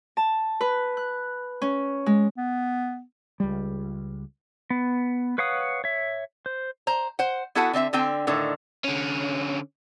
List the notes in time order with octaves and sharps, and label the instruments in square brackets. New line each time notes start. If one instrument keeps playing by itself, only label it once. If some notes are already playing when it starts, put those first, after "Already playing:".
[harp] A5
B4
F#6
C#4
G#3
[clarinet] B3
[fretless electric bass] C#2 G3
[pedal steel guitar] B3
B4 C#5 F5 F#5 D#6
C#5 E5
C5
[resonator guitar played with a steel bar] C5 A#5
C5 F#5
B3 E4 F#4 A4 F#5 G#5
D3 C4 D#5 E5
D3 C4 G5 G#5
A2 D3 D#3
[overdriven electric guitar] D3 C#4